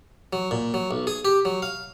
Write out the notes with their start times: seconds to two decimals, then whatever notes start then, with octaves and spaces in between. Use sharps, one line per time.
0.33 F#3
0.51 A#2
0.74 F#3
0.91 B1
1.07 G#4
1.25 G4
1.45 F#3
1.62 F5